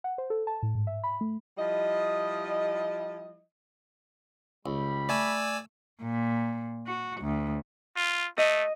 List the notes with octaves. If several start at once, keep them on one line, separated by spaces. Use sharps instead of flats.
F#5
C5
A4
A5
A2
G#2
E5
B5
A3
F3 G3 E4 D#5
C#2 G3 B5
A3 D5 G#5 E6
A#2
F#4
D2
F4
A3 D#5